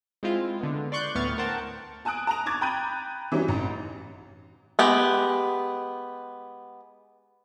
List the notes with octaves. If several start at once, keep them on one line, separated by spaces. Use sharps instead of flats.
G#3 C4 E4 F4
D3 B3
D5 C6 C#6 F#6 G6
D2 A2 B3 C#6 F6 A6
A#4 C5 F#5 G5 A5
G#5 A5 D#6 F#6 D7
A5 A#5 F7
C#6 D6 G#6 A6
G5 A#5 B5 F#6 G6 D#7
E3 F#3 G3 C#4 D#4
A1 A#5
G#3 B3 G4